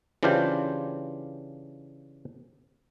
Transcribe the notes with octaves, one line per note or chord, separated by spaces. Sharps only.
C#3 E3 D4 F4 G4 C5